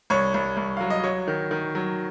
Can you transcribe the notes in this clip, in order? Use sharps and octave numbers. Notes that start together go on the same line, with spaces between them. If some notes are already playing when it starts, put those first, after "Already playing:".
C2 C#5
C2
C2
F#3 F5
D#5
F#3 C#5
D#3
D#3
F#3